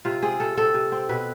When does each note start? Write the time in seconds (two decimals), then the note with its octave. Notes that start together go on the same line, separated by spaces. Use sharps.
0.05 C3 F4
0.22 C4 G#4
0.40 C3 A4
0.57 C4 A4
0.74 C3
0.92 C4
1.09 B2 B4